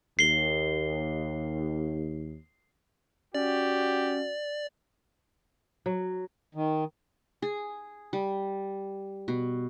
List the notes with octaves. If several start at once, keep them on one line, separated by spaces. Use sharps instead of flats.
D#2 C7 G7
C#4 F#4 G4 D5
F#3
D#3
G#4
G3
B2